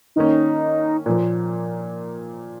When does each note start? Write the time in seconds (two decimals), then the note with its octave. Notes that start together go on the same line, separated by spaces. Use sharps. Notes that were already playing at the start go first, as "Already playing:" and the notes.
0.16 D#3 A#3 C#4 D#4
1.06 A#2 F3 A#3